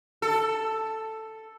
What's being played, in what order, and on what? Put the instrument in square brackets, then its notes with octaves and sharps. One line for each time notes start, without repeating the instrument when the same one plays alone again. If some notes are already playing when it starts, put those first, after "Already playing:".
[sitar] A4